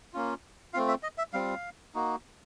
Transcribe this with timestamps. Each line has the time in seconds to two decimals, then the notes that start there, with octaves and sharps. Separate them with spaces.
0.13 A#3 C#4 F4
0.74 A3 C4 F4 F5
0.88 E5
1.03 D#5
1.18 E5
1.33 G3 C4 F4 F5
1.95 A#3 D#4 F#4